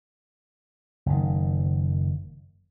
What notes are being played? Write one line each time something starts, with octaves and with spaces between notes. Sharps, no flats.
F#1 D#3